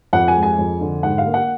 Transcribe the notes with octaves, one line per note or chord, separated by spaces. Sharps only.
F2 F#5
G#5
G#3
G#5
F2
D3
G#2 F#5
F5
A#3
F#5